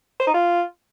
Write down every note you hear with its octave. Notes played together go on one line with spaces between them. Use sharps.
C5
D#4
F4